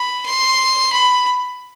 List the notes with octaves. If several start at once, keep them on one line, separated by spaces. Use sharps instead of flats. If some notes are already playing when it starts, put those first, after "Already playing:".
Already playing: B5
C6
B5